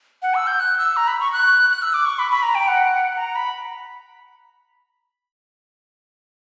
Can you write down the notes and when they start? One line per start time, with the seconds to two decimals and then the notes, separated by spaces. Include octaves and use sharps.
0.22 F#5
0.35 E6
0.47 G6
0.60 F#6
0.78 E6
0.96 A#5
1.08 B5
1.21 C#6
1.33 F#6
1.70 F#6
1.82 E6
1.94 D6
2.06 C#6
2.19 B5
2.31 B5
2.43 A#5
2.55 G5
2.68 F#5
3.17 A#5
3.36 B5